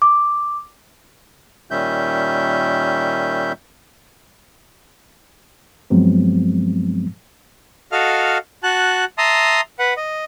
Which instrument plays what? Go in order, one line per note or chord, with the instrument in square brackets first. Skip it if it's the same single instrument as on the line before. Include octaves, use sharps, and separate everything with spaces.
[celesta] D6
[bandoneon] A#2 D#3 G3 C#4 E5 G6
[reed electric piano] G2 F3 F#3 G#3 B3 C4
[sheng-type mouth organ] F#4 A4 D#5 F5 F6
F#4 A5 F#6
E5 A5 A#5 C6 D#6
B4 F#5
D#5